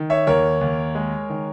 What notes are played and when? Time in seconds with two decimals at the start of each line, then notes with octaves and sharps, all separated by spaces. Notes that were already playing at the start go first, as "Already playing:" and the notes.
Already playing: D#3
0.10 C#5 E5
0.27 D#2 A#4 C#5
0.61 D#2
0.95 G#3
1.30 D#3